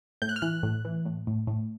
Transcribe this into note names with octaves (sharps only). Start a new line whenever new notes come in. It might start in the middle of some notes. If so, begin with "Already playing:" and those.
A2 G6
F#6
F6
E3 F#6
A2
E3
A2
A2
A2